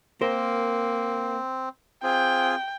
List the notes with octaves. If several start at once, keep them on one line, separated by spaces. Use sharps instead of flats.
A#3 C4 A#4 C5
C4 F4 G#4 G5